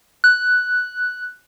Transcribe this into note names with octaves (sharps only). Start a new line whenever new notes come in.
F#6